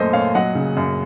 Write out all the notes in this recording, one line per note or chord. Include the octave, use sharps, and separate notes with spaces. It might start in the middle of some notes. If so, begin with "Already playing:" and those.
Already playing: F#2 A#2 A3 A#4 C5 D#5
A#2 C#5 F5
F#3 D#5 F#5
C#3
F#2